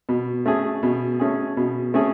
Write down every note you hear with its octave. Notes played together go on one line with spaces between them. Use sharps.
B2
A3 C#4 G#4
B2
A3 C#4 G#4
B2
A3 C#4 G#4